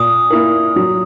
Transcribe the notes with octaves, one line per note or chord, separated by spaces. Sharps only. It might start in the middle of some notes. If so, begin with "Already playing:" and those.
Already playing: A#2 D#6
A#3 E4 A#4
F#3